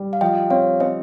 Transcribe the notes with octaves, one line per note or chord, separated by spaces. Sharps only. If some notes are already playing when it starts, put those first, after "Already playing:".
Already playing: G3
F5
F3 D#5 G5
C4 C#5 F5
C4 C5 D#5